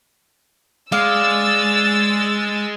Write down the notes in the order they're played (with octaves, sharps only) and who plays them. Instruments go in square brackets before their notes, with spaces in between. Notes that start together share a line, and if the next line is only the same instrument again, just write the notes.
[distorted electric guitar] G#3 [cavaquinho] D5 F5 [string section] E6 A6